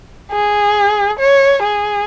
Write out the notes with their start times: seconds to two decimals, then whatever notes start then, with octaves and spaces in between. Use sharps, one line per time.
0.32 G#4
1.19 C#5
1.63 G#4